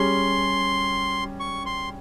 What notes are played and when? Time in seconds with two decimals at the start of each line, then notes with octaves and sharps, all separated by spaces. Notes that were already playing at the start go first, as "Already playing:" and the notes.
Already playing: G3 C#4 G#4 C6
1.40 C#6
1.66 C6